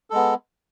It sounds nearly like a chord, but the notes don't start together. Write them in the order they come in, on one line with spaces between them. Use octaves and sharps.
A4 G#3 B3